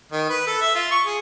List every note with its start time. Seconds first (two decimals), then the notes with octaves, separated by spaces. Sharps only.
0.12 D#3
0.29 B4
0.47 A4
0.61 E5
0.75 F4
0.91 C#6
1.06 G#4